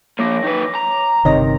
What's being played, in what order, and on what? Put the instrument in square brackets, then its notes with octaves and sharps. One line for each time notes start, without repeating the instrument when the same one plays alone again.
[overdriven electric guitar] F3 A#3 [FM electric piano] C#5 D6 A#6
[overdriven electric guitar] D#3 B4
A#5
[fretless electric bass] G1 C3 D#3 [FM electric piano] C#5 D#5 A#6